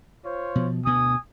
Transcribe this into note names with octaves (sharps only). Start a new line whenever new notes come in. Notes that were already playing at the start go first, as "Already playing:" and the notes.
F4 C5 C#5
B2 F3
D2 B2 B3 G#5 D#6